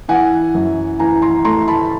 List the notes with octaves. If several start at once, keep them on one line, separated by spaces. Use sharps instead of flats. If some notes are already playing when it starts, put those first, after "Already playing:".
E3 F#5 G#5
F#2
E3 G#5 A#5
A#5 C6
A3 A#5 C6
A5 B5